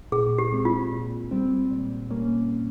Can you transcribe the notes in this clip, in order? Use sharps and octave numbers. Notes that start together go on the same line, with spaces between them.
A#2 G#4
G4
G#3 C4
F4
A#2
G3 C4
A#2
G3 A#3 C#4